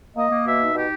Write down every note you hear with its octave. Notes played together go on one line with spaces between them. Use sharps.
A#3 D#5
A#3
B2 E5
D#4
B2 G4